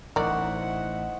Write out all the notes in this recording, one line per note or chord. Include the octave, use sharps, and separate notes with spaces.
A1 D#4 E4 F#4 A#4 C5 D5 F#5